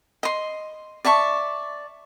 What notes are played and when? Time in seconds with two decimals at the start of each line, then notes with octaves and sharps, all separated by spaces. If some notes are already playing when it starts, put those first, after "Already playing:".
0.23 D#5 C6
1.05 D5 E5 A5 C#6